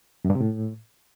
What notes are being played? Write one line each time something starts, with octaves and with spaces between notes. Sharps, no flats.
F#2
G2
C3
A2